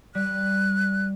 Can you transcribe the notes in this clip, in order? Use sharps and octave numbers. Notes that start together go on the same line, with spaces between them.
G3 F#6